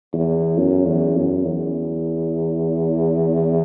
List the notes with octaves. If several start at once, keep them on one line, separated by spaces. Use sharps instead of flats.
E2
F#2
E2
F#2
E2